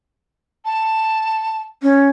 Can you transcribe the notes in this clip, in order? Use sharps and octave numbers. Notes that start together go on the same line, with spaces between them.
A5
C#4